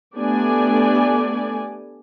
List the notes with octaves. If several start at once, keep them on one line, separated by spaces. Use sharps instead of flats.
A3 B3 D4 G4 D5 G#5